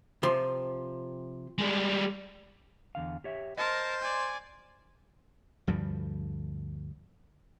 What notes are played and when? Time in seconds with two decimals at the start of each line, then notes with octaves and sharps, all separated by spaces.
0.23 C3 F3 C6
1.58 G3 G#3
2.95 E2 D3 F5
3.24 G4 C#5 E5
3.57 A#4 C5 D#5 A5
4.01 D5 G#5
5.67 D2 G2 F3 G3